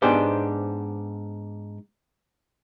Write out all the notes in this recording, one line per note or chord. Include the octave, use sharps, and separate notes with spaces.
G#2 B3 D4 G4 C5